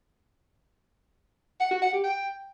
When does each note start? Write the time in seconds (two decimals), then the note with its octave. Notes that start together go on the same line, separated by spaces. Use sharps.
1.60 F#5
1.71 F#4
1.82 F#5
1.93 G4
2.04 G5